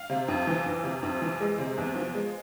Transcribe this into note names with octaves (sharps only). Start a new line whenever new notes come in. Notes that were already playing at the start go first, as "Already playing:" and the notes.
Already playing: F5
C3
F2
E3
F2
C3
F2
E3
G#3
C3
E2
F3
G#3